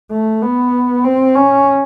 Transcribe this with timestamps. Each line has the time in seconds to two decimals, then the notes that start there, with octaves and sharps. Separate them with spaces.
0.11 A3
0.42 B3
1.04 C4
1.35 C#4